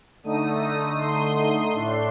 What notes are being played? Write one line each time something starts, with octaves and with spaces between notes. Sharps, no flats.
D3 A3 D#4 D#6
C6
A2 A3 D4